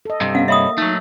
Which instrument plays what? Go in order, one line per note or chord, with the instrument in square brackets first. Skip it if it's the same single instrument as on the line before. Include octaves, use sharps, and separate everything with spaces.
[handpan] A4 D#5
[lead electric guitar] G2 C3
[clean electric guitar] B3 C#4 [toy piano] F5 F#5
[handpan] A#3 [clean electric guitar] C#5 D#5 B5 [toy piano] E5 D#6
[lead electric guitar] F#3 A3 [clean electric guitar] D#4